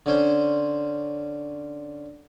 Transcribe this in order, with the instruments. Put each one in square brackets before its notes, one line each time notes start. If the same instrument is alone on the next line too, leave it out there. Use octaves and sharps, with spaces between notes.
[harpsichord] D3 C#4 C5